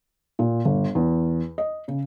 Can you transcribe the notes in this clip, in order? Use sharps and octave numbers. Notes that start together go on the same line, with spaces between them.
A#2
G1
E2
D#5
C#3